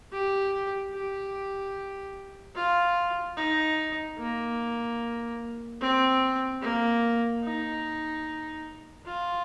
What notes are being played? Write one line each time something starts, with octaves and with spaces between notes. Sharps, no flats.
G4
G4
F4
D#4
A#3
C4
A#3
D#4
F4